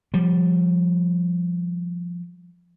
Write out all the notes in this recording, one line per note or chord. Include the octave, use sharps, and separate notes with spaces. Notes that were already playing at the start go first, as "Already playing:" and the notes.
F3 G3